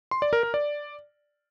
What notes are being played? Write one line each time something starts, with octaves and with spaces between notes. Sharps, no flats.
C6
D5
A#4
A#4
D5